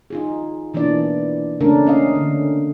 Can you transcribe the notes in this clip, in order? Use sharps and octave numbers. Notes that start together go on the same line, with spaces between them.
D#4 F4 G#4
B2 E3 A#3 D4 D5
C#3 A3 A#3 C#4 D4 A#4
C#4 D#5 F5
D3